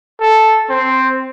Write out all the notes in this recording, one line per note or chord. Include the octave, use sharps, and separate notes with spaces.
A4
C4